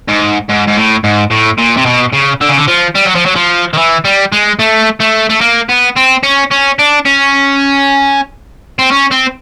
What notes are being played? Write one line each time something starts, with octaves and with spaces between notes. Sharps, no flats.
G#2
G#2
G#2
A2
G#2
A2
A#2
C3
B2
C#3
D3
C#3
D3
F3
G3
F#3
F3
F#3
F3
D#3
E3
G3
G#3
A3
A3
A3
A#3
B3
C4
C#4
C#4
D4
C#4
C4
C#4
C4